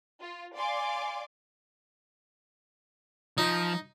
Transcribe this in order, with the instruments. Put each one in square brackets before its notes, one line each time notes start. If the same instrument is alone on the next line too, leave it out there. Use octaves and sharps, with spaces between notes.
[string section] F4
D5 F5 G#5 C6 D6
[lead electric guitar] F3 [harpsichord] D#4